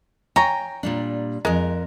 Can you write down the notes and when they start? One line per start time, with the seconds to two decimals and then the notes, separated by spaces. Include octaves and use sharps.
0.36 C#5 G5 G#5 A#5
0.83 A#2 G3 D4
1.45 F2 G#3 A#4